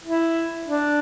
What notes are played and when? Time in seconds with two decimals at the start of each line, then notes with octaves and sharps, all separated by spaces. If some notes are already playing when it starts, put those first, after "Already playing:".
0.04 E4
0.67 D4